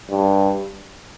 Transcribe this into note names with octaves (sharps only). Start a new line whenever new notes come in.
G2